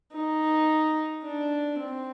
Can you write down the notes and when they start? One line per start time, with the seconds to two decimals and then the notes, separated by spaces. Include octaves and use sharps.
0.13 D#4
1.24 D4
1.79 C4